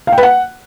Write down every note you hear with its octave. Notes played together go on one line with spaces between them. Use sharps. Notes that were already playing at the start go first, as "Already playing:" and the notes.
F5
G5
B4
F#5